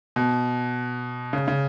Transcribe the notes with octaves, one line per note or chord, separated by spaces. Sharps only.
B2
C#3
C#3